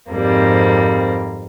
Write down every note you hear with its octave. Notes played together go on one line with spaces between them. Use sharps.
F2 G#2 G3 A#3 C4